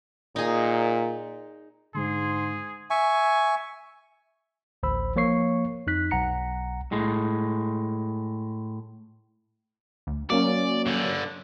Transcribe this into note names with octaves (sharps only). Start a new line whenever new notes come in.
A#2 D#4 G#4
G#2 D3 G#3 G#4 C6
E5 G#5 C#6
A1 D2 C5 B5 E6
F3 A#3 C#5 C#6 C7
F2 D#4 F#6 B6
B1 F#5 A#5 C#7
A2 G#3
D2
F#3 A#3 C#4 D5
G2 D3